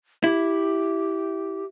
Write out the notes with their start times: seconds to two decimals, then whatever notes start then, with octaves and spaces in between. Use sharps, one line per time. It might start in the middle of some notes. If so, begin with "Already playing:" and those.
0.24 E4 G4